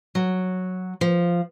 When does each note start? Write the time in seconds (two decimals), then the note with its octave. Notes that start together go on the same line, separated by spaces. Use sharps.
0.15 F#3
1.01 F3